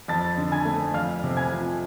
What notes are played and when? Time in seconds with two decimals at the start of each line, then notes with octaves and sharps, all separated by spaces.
0.08 F2 A5 A6
0.38 D3
0.52 G#5 G#6
0.65 A3
0.94 F2 F5 F6
1.23 C3
1.37 G#5 G#6
1.52 F3